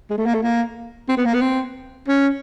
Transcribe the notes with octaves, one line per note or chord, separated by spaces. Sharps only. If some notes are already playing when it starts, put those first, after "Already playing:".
G#3
A3
A#3
A3
A#3
C4
B3
A#3
B3
C4
C#4